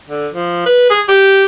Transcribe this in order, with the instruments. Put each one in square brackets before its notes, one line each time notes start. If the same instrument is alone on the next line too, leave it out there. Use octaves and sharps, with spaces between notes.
[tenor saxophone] D3
F3
B4
G#4
G4